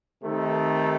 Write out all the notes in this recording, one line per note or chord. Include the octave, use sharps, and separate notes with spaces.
C3 D#3 A3 D#4 A4